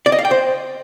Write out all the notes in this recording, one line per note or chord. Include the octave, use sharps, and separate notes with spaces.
D5
D#5
F5
G5
C5